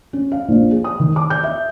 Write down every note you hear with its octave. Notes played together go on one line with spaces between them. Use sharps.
C#4
F5
A#1
G#4
D#6
D#3
D6
G6
E5